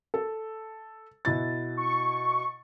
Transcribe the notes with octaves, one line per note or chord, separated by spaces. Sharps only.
A4
B2 E4 A6
C#6